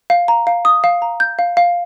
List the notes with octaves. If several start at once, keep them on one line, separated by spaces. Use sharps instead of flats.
F5
A#5
F5
D#6
F5
A#5
G6
F5
F5